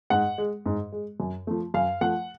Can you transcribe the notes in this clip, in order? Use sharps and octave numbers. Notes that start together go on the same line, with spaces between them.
G#2 F#5
G#3
G#2
G#3
F#2
F3 A3
F#2 F5
F3 A3 F#5